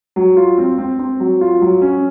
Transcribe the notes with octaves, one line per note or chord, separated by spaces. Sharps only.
F#3
F4
C4
C4
C4
F#3
F4
F#3
C#4